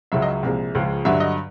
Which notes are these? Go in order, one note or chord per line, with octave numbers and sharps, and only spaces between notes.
C#2 C#3 F#3 E5
D#5
E5
C2 A#2 F3 G#3
C#2 C#3 F3 G#3
G2 D3 F#3 E5
D#5